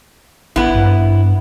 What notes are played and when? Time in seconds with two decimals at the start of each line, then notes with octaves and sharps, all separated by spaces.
0.56 A1 B3 E4
0.75 G2